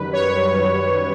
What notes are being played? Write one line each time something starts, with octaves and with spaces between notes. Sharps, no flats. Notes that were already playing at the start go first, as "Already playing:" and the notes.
Already playing: F#2 D#3 G3 B4
C#5